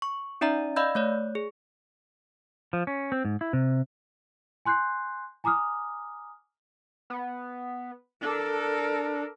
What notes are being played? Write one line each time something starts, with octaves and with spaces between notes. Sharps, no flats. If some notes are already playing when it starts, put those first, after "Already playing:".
C#6
C#4 D#4 D5 E5 A#5
D5 D#5 F5 B5 E6 G6
A3 C#5 D5
G#4
F3
C#4
C4
G#2
E4
C3
G#5 C6 F#6 G6 C7
G#5 A#5 D6 D#6 F6
B3
D4 A4 A#4